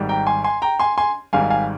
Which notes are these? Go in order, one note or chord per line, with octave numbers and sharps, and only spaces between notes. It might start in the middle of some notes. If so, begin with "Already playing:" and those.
Already playing: G#1 G#2 G3
G5 A#5
G#5 C6
G#5 C6
G5 A#5
G#5 C6
G#5 C6
G#1 G#2 G3 F5 G#5
F5 G#5